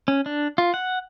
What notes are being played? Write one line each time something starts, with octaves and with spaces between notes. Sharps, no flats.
C#4
D4
F4
F#5